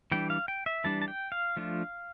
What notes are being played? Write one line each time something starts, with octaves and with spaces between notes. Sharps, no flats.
E3 G3 D4 G5
F5
G5
E5
E3 G3 D4 A5
A5
G5
F5
F3 A3 D4 F4